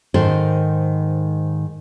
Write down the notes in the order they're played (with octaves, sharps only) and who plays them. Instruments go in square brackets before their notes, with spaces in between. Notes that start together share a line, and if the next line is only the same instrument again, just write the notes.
[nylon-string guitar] G#2 D#3 A4 C5